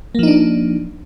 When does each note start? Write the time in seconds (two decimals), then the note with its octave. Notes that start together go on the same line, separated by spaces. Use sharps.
0.15 A#3
0.19 F3
0.23 D#4
0.27 D4